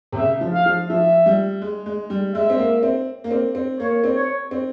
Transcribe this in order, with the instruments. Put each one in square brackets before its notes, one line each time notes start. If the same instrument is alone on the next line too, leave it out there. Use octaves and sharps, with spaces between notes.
[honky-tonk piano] C3
[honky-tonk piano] C#3 [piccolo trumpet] E5
[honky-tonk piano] F3
[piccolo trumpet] F5
[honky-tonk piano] F3
[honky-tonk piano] F3 [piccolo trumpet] E5
[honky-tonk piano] G3
G#3
G#3
G3
[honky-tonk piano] G#3 [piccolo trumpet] E5
[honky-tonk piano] C4
A#3
C4
A#3
C4
C4
[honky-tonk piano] A#3 [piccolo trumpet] C#5
[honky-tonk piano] C4
[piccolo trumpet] C#5
[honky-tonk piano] C4